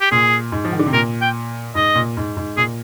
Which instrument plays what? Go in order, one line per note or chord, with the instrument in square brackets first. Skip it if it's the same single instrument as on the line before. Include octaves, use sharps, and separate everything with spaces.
[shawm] G4
[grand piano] A#2 [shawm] G#4
[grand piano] G#2
F3
D#3
D3
C3
[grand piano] A#2 [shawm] A#4
[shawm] G5
[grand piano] G#2 [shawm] D#5
[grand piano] A#2
G#2
G#2
[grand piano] A#2 [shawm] G#4